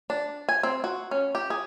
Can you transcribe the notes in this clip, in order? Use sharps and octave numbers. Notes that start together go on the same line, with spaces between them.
D4
G#5
C4
F#4
C#4
G4
G#4